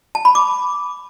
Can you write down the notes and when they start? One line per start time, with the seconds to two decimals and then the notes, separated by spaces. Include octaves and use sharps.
0.15 A5
0.25 B5
0.35 D6